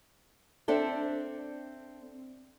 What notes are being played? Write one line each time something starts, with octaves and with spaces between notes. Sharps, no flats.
C4 D4 A4 E5